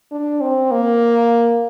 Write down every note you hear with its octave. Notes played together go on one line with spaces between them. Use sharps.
D4
C4
A#3